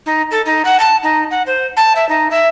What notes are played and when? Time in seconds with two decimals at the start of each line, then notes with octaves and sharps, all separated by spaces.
0.06 D#4
0.31 A4
0.46 D#4
0.65 F#5
0.80 A5
1.03 D#4
1.31 F#5
1.46 C5
1.77 A5
1.95 E5
2.09 D#4
2.31 E5